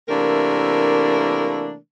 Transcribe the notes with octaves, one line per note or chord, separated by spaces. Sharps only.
C3 E3 A3 A#3 D4 A#4